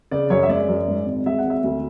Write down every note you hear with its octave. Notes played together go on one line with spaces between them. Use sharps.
C#3 D5
F#2 C#5
E5
G#3 D5
F#2
G#2
G#1
G#3 E5
F#5
G#1
E5
D2